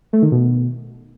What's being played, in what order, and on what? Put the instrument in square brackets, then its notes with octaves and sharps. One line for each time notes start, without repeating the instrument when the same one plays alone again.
[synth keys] A3
D#3
B2